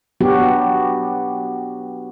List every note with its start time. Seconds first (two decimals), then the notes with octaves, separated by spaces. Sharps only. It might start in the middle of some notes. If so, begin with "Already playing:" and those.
0.21 F#3 B3 D4 F#4 G4